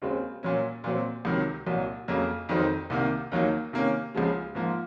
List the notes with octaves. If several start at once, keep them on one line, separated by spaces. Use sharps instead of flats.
D#2 C#3 G#3 C4
A#2 F#3 C#4
A#2 F#3 C4
C#2 C3 D#3 F#3
C2 A#2 F#3
F2 C#3 F#3 A#3
F2 D#3 F#3 C4 D#4
C2 C3 D#3 A#3
D#2 D#3 F#3 A#3 D#4
C3 D#3 A#3 C#4
C#2 C#3 F3 G#3
G#2 F3 A#3